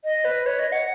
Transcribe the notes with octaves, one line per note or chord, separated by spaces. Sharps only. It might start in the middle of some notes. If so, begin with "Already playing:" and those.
D#5
B4
C#5
D#5
F#5